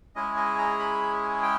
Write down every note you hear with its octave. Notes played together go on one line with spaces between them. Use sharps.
G#3 C#4 E4 G#4 D#5
D#5
A#5
B5
G5